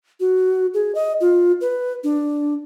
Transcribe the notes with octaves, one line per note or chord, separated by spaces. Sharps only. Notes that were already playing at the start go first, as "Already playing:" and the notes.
F#4
G#4
D#5
F4
B4
D4